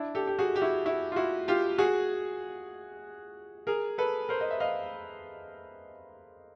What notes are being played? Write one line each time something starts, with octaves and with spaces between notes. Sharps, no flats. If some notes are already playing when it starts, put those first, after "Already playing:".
Already playing: D4 E4
G4 A4
G4
F#4 G#4
G4
E4 F#4
E4 F#4
F4
E4 F#4
F4 G4
F#4 G#4
G#4 A#4
A4 B4
A#4 C5
D#5
E5
D#5 F5